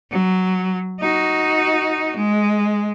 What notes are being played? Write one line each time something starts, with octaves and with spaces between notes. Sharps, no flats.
F#3
D#4 F#4
G#3